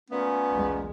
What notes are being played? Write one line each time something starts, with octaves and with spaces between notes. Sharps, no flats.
A#2 A3 B3 C#4
B1 E2 G#3